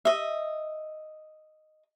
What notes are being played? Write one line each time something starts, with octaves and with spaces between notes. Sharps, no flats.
D#5 E5